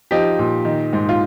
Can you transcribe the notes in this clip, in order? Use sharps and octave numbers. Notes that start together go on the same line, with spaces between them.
F3 D#4 G4
A#2
D#3
G#2
F4